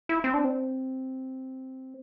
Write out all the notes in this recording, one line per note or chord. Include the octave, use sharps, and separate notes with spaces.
E4
C4
D4
C4